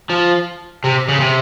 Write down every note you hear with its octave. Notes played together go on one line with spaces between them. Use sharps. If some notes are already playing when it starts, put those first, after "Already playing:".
F3
C3
C#3
C3